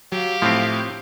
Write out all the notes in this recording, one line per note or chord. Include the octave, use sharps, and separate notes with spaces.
F#3 G4 F5
A2 F3 C4